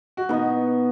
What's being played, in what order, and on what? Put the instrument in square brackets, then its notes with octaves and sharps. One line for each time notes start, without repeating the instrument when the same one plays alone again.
[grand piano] F#4
[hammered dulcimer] B2 B3 F#4 [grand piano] D#4